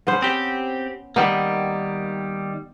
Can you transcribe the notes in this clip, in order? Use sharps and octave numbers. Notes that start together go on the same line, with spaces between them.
B3 C#4 C5
C4 G4
D#3 G3 A#3 B3